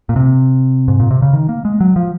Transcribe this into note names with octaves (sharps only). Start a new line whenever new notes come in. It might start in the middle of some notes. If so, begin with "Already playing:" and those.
A#2
C3
G#2
A#2
C3
C#3
D#3
A#3
G#3
F#3
F3